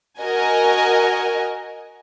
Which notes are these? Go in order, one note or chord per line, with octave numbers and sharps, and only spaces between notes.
F#4 A#4 D#5 G#5